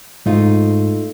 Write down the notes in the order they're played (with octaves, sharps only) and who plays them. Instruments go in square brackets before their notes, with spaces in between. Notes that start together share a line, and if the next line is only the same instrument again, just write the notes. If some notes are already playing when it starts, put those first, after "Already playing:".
[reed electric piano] G#2 [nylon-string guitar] A3 D#4 F4